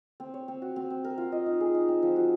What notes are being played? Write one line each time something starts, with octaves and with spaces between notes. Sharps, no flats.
C4
C#5
C4
F#4
C4
C4
A#4
F4
D#5
D#4
G#4
D#4
C4
F3
F#4